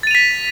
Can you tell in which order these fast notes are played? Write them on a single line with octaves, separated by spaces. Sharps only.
A6 D#7 F7 B6